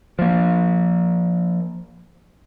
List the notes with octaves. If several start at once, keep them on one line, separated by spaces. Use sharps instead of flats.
F3 A#3